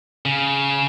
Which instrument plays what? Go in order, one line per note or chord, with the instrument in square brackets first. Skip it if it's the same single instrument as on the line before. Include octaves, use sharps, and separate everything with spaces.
[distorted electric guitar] C#3